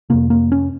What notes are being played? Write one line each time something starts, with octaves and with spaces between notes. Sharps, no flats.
F2 C3 A#3
A#3
C#4